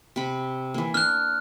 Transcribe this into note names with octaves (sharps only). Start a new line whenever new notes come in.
C3 B5
E3 A#3
D4 F6 F#6